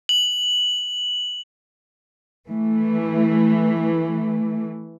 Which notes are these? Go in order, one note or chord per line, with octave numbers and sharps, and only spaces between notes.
F#7
E3 A3